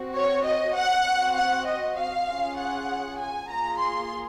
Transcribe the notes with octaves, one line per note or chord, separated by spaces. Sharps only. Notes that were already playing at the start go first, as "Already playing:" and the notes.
Already playing: C4 F#4
C#5
D#5
F#5
C4 F#4
F#5
D#5
F5
C#4 F4 G#4
F#5
G#5
A#3 F4 G#4 A#5
C6